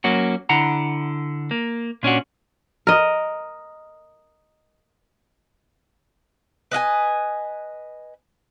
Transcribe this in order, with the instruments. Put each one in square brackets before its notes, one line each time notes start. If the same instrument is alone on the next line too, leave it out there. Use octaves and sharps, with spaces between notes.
[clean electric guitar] F#3 A#3 C#4 F#4
D3 E4 F#5 A#5
A#3
A#2 C#4 D4 F#4
[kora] A#4 D#5
[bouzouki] B4 D#5 F5 G#5